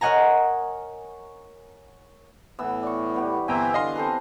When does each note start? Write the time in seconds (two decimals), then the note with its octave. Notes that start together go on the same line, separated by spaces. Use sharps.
0.01 A#4 C#5 D#5 F#5 G#5 A#5
2.59 A2 E3 B3 E6
2.83 D5 C#6
3.14 G3 B3 G4
3.48 G1 E3 C4 E4 G5 G#5 A#5
3.74 D3 D#5 F5 C6
3.96 C4 A4 B4